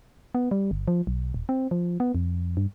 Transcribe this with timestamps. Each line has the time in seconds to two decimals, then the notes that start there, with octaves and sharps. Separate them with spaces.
0.35 B3
0.51 G3
0.71 G1
0.88 F3
1.07 B1
1.34 D#1
1.49 C4
1.71 F3
2.00 B3
2.15 F2
2.57 G2